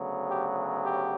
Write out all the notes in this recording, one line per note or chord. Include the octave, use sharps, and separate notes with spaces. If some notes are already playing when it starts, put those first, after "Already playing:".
Already playing: D2 C#3 F#3 B3
G4
G4